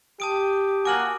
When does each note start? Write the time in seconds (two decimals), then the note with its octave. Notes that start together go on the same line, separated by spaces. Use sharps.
0.20 G4 A5 D#6 D7
0.85 A#3 F#4 G#5 D6 F6 F#7